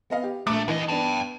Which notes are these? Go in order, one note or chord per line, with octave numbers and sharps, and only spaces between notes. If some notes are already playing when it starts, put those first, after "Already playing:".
B3 D#5 F5
G4
A#1 A3 D6
D#2 E3 D#5
B3 D4 G5 A5